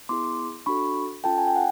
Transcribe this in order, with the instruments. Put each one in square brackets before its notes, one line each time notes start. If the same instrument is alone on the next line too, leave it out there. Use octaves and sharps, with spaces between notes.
[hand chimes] B3 E4 G#4 C6 D6
D4 F#4 A4 B5 C#6
C#4 F4 A4 G5 A5
G#5
G5
F#5